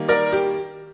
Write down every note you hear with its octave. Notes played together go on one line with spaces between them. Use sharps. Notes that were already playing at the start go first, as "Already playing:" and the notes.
Already playing: D#3 G3 A#3
A#4 D5
G4